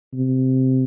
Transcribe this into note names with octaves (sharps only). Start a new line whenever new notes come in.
C3